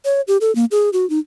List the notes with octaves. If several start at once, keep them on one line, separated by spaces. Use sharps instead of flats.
C#5
G4
A4
A#3
G#4
F#4
D#4